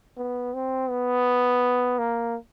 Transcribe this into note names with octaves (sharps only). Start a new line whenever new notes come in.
B3
C4
B3
A#3